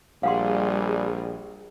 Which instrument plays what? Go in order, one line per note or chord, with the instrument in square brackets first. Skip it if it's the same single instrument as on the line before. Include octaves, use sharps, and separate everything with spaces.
[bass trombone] A#1 [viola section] G3 G#4 [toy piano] F5 F#5 C6